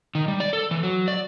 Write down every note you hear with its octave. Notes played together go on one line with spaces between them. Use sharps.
D#3
G3
D5
A4
E3
F#3
D5